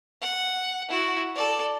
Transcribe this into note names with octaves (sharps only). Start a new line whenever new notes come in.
F#5
E4 F#4
A4 D5